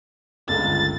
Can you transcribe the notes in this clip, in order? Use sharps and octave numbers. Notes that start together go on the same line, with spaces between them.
G1 C#2 A6